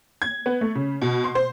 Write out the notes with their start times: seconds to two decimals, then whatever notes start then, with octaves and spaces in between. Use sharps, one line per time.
0.22 G#6
0.46 B3
0.61 A3
0.75 C#3
1.02 B2
1.24 C6
1.35 C5